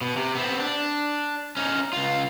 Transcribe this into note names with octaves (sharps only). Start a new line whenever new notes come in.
B2
C3
B3 C4
D4
C#4 D#4
C#2 F4